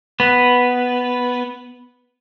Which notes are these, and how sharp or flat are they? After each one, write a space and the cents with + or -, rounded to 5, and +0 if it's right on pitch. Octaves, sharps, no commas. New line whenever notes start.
B3 +0 B4 +0